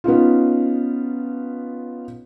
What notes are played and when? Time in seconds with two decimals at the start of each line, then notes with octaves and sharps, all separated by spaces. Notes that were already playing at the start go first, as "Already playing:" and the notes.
0.04 B3 C#4 D#4 F4